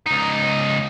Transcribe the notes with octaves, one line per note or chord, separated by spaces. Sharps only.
C#2 D#4